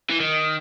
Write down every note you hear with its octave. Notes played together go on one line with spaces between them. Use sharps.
E3
D#3